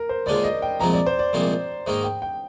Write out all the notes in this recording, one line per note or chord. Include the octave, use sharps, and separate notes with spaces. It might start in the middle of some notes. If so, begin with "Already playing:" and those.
Already playing: A#4
C5
D#2 D3 G#3 D4 F4 D5
D#5
G5
C2 A#2 F3 G#3 C4 A#5
D5
C5
D5
C2 A#2 F3 G#3 C4
G#2 D#3 A#3 D#4
G5
G5